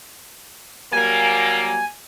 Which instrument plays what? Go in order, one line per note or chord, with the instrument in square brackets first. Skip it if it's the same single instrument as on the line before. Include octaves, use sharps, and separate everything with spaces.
[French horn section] F#3 G3 A#3 [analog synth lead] G#5